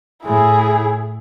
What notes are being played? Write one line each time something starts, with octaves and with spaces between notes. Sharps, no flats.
A2 E4 G#4